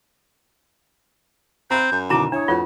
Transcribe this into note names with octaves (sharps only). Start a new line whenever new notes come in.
C4 A#5 B5 F#6 G6
F#2
B2 D3 D#3 E4 A5 A#5 D6
D4 E4 C#5 D#6
F2 A2 F4 F#4 B4